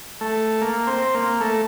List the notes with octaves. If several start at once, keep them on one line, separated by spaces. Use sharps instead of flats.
A3
A#3
C4
A#3
A3